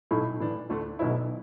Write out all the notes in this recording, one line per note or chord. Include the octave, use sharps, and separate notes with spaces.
B1 A2 A3
A2 E3 D4
D2 D3 A3 D4
B1 B2 F#3 B3 E4